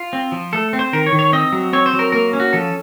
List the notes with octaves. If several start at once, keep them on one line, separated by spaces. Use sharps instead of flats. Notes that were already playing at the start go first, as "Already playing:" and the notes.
Already playing: F4
C4
F3
A3 A4
C4
C5
D#3 A#4
C#5
D#3
C#5
C4 D#5
F#3
C4 C#5
C5
F#3
A#4
A#3 A#4
C#4
F#4
F3 A4